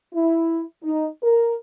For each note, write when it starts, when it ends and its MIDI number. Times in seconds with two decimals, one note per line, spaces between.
0.13 0.63 64
0.83 1.07 63
1.22 1.54 70